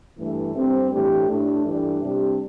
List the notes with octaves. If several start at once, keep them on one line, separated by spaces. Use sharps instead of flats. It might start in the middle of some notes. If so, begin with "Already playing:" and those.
G2 E3 A3
G2 G3 C4
A2 E3 A3 D4 G4
A2 A3 D4 G4
G2 E3 A3 D4 G4
C3 G3 D4 G4